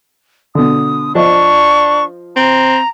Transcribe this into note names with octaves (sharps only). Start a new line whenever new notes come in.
B2 D3 D#6
F3 D4 D#5 C#6
C4 A#5